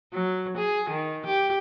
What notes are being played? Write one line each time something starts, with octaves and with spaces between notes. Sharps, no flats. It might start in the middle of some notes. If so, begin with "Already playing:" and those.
F#3
G#4
D#3
G4